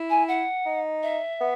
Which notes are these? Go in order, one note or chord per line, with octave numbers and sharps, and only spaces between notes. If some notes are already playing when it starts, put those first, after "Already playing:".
Already playing: E4
G#5
F#5
D#4
E5
B3